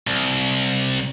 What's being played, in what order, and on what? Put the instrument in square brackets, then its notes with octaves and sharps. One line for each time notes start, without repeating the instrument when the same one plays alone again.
[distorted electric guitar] C2